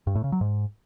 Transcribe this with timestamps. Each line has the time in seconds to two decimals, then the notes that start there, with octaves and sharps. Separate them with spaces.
0.07 G2
0.15 A2
0.24 C#3
0.32 F#3
0.41 G#2